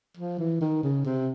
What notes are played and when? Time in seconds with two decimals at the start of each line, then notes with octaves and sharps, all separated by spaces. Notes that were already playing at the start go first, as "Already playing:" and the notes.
0.17 F3
0.39 E3
0.61 D#3
0.83 C#3
1.05 C3